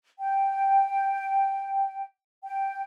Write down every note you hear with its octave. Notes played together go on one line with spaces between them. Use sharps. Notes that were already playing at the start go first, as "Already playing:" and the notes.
G5
G5